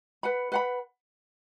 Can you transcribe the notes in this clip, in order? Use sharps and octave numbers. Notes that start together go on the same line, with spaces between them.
B4 F#5 B5
B4 F#5 B5